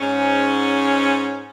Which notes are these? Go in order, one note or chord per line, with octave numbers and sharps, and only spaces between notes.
G#2 C#4